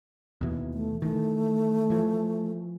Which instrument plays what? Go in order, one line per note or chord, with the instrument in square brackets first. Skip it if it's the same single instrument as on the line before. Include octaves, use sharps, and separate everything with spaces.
[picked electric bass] D#2 B2 E3
[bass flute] A3
[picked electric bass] D#3 E3 [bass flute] A3
[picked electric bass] E3 F3